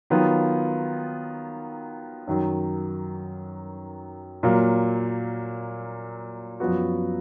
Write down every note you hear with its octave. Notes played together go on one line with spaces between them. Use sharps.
D#3 F#3 B3 F4
F#2 D#3 F#3
A#2 F#3 A#3
F#2 F3 B3 F#4